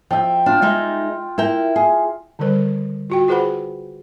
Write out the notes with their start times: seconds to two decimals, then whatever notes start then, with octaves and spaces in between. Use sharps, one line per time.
0.11 F3 E5 G5
0.46 D4 F4
0.62 G#3 D#4 E5
1.38 E4 A#4 G5
1.76 G#4
2.39 D3 D#3 G3 A#4 C5
3.10 F4 F#4 G5
3.28 F4 G#4 B4 C5 F#5 B5